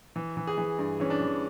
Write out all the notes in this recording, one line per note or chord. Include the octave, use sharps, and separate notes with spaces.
E3
E3
G#4
E3
G2
E3 C#4
D4
E3